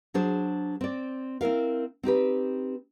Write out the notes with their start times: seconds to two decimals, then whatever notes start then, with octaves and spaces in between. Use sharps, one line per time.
0.14 F#3 D4 G#4 C5
0.81 C4 D5
1.41 C4 E4 A#4 F5
2.03 C4 D#4 G4 B4